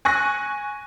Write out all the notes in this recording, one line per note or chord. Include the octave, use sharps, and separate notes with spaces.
G#5 C#6 F#6 A#6